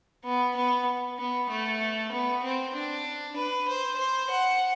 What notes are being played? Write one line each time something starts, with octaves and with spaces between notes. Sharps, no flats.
B3
B3
B3
A3
B3
C4
D4
B4
C5
C5
F#5